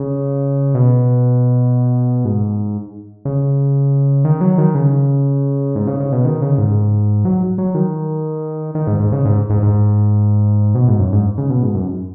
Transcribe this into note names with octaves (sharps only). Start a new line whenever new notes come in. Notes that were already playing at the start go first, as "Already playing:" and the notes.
Already playing: C#3
B2
G#2
C#3
D#3
F#3
D#3
C#3
G#2
C#3
C#3
B2
D#3
C#3
G#2
F#3
F#3
D#3
D#3
G#2
G#2
C#3
G#2
G#2
G#2
B2
G#2
F#2
G#2
C#3
B2
G#2
F#2